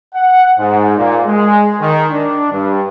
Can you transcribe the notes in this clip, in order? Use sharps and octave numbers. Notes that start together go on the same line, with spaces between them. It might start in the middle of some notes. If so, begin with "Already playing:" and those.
F#5
G#2
A#2
G#3
D#3
D4
G2